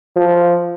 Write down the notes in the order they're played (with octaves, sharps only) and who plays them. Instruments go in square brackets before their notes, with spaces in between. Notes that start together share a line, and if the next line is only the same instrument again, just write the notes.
[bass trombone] F3